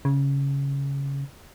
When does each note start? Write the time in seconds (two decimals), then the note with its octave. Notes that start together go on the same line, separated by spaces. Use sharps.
0.05 C#3